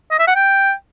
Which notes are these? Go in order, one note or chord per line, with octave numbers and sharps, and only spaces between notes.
D#5
E5
F#5
G5